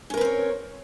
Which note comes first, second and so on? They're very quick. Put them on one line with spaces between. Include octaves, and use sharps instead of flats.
C#4 A#4 B4 C4 C#5